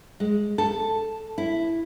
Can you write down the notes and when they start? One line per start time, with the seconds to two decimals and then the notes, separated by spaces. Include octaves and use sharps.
0.20 G#3
0.58 A4
1.38 E4